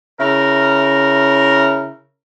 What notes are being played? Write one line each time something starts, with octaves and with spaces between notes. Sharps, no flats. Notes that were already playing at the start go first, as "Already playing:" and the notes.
C#3 E4 A#4